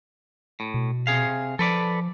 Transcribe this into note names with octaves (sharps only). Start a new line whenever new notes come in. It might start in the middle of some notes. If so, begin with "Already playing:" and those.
A2
B2
C3 G#4 F5
F3 A4 B4 D5